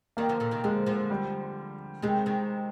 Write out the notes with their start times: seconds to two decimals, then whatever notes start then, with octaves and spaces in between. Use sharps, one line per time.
0.17 D#3 G3 A#3
0.29 D3 F3
0.40 A#2 D3
0.51 C3 D#3
0.64 D3 F3 G#3
0.86 D3 F3
1.10 G3
2.02 C3 D#3 G#3
2.26 C3 D#3